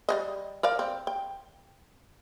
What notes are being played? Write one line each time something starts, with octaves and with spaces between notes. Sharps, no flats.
G3 A3 D#5
A#4 D5 F5
C4
G5